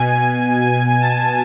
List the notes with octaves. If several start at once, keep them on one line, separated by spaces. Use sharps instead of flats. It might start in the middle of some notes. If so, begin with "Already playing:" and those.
Already playing: B2 G#5
G#5
A5